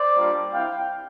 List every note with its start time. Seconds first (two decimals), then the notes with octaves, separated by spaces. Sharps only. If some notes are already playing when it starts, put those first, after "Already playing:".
Already playing: C5 D5
0.17 G3 A#3 D4 F4
0.52 G3 C4 E4 F5 G5